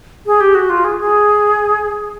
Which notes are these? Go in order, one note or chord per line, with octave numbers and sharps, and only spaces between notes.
G#4
G4
F#4
F4
G#4
G#4